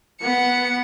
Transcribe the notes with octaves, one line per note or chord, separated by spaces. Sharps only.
B3 F#5 C#7